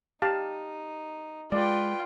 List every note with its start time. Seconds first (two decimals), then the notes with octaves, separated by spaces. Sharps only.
0.22 D#4 G4 F5 A5
1.52 G#3 F4 B4 D5 G5